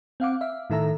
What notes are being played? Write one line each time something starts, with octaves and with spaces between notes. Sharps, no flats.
C4 F5 F#5 D6
E5 F5
A2 D#3 A4 E5 A#5